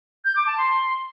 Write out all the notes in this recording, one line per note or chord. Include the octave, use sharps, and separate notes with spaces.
G6
D6
A5
C6